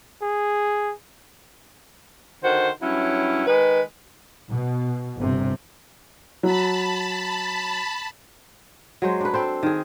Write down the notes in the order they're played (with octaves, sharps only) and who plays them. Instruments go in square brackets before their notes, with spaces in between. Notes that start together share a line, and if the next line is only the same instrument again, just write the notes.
[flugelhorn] G#4
[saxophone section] D3 D#3 F#4 C5
G2 F#3 C#4 E4
D#3 G#3 B4
[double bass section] B2
G1 C3
[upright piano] F#3 [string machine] A5 B5
[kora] F#3 G#3 C5
D4 B4
C4 A4 C5
D#3 G#4